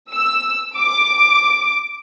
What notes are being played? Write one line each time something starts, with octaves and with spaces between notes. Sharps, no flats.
E6
D6